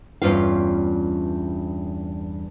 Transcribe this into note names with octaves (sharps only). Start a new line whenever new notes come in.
E2 G2 C#4 F4 F5